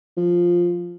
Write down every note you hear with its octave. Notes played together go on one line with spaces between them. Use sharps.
F3